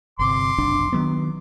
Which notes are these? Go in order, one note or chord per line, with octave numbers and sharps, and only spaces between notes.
G1 C3 C6 D6
F1 B1 D4
D#3 F#3 B3